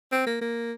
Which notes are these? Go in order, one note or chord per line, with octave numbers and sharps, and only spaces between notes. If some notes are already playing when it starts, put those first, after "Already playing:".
C4
A#3
A#3